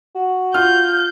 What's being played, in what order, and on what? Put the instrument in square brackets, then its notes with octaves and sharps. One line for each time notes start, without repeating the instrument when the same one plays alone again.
[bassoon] F#4
[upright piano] F4 F6 [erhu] G6